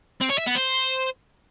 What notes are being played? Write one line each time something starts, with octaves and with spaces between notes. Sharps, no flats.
C4
C#5
E5
B3
C5